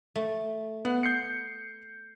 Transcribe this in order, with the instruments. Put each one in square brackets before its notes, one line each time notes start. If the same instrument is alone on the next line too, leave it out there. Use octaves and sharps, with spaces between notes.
[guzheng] A3
[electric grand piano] B3 [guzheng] F#5
[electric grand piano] G6 C7 C#7